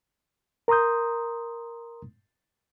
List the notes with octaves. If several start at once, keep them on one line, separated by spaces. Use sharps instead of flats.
A#4 A#5 C6 D#6 G6